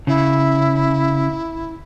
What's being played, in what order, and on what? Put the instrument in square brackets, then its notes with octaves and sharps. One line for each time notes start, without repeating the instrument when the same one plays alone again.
[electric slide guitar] C#3 [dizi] E4